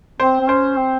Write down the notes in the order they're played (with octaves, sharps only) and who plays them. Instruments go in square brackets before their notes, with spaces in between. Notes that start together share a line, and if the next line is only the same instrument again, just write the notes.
[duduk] C4 [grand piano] C5
[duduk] C4
[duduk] C#4 [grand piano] C5
[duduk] C4